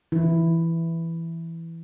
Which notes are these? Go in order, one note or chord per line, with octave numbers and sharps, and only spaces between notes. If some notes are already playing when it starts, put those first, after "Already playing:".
E3 E4